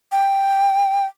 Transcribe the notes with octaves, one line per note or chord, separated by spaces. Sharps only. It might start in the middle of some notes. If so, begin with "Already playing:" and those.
G5